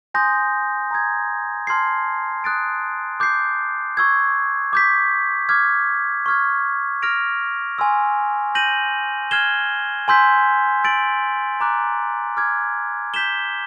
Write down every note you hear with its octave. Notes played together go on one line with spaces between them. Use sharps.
G#5 C6 D#6 G6 A#6
A#5 D#6 G#6
A5 C6 F6 G#6 C7
D#6 F#6 A6 D7
D6 G6 C7
C#6 E6 G#6
D6 G6 B6
D6 F6 G#6
C#6 F6 G#6
F6 A#6 D7 F7
G#5 C6 E6
G6 A#6 D#7 F#7
F6 G#6 C7 E7 G7
G#5 C6 E6 G6 B6
E6 A6 D7 F#7
A#5 D6 F#6
D6 F6 G#6
G6 B6 E7 G7